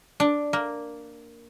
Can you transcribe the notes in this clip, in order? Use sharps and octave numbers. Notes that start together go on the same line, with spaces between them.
D4
A#3